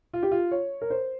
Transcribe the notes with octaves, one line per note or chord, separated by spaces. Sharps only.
F4
G4
F4
C#5
A#4
C5